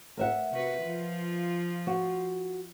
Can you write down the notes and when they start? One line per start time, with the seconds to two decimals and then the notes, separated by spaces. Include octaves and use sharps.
0.17 A#4 E5 F#5
0.50 C3 F#4 B4
0.80 F3 F4
1.87 F#4